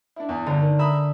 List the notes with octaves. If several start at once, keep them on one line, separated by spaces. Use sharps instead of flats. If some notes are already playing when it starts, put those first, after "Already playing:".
D4 E4
E2
G1 D3
D#3
E5 A#5 B5 D#6